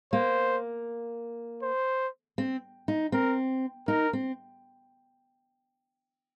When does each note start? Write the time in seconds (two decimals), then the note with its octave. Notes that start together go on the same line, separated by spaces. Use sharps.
0.12 A#3 C5
1.62 C5
2.38 C4
2.88 D#4
3.12 C4 A#4
3.88 D#4 A#4
4.13 C4